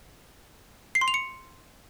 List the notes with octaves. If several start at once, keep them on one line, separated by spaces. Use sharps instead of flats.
C7
C6
F7
C#7